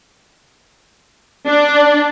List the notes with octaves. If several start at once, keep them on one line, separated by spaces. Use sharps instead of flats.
D4